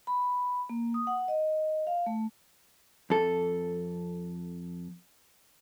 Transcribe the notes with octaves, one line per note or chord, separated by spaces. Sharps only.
B5
A#3
D#6
F#5
D#5
F5
A3
F2 A4